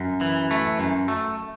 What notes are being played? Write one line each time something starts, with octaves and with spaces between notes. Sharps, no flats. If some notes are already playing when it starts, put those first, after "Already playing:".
Already playing: F#2
E3
A3
F#2
A3